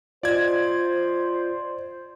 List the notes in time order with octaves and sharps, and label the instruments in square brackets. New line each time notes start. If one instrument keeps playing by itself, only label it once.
[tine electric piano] F4 D#5 [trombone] C5 [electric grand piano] D5 G#6